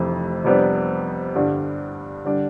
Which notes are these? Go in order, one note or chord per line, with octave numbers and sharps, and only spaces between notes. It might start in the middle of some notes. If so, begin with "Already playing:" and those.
Already playing: F1 F2 C3 E3 A3
F2 C3 G3 B3 D4
G2 D3 G3 D4
D3 G3 D4